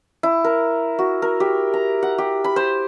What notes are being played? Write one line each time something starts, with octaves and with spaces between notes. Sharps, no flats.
E4
A#4
F#4
A#4
G4
A#5
F#5
G4
B5
C5